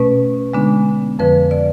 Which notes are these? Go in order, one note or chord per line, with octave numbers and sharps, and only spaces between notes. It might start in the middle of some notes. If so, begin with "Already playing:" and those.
Already playing: B2 A3 C#4 B4
D3 G#3 B3 D4
F2 D3 F3 B4
D5